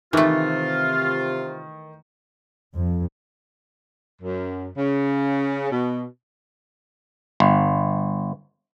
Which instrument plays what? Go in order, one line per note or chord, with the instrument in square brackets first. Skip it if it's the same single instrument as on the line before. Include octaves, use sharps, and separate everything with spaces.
[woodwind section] C3 F4 [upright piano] D#3 [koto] E3 A3
[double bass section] F2
[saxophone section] F#2
C#3
B2
[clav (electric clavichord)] G1